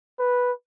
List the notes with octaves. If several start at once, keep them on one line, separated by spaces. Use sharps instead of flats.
B4